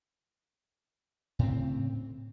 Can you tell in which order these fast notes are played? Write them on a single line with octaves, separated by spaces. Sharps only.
A2 C4 C#3